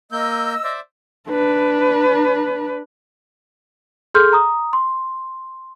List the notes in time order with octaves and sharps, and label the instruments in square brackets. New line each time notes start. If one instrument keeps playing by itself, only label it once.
[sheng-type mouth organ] A#3 G6 [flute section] D#5 E6
[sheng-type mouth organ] C5 D5 E5
[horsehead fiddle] D4 B4
[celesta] G#4 A4 C6 F6 G6
A#5 D#6
C6